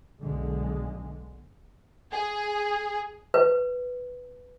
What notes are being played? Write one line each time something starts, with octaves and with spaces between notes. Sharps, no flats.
B1 D3 G#3
G#4
B4